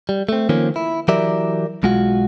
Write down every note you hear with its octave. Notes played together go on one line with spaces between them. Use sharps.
G3
A3 C4
D#3 F3 A#3 C4 C#4
E4
E3 F#3 G4 A#4 D5 E5
B1 G#3 F4 F#4